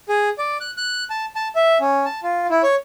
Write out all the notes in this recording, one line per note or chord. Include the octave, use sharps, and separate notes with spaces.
G#4
D5
F#6
F#6
A5
A5
E5
C#4
A5
F4
E4
C#5